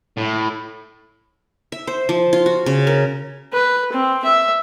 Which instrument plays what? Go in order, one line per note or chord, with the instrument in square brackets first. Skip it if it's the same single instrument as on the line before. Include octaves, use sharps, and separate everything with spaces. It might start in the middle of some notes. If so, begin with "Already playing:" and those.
[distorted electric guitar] A2
[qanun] E5
C5
F3
F4
F#4
C#3
A#4
[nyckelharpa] B4
C4
E5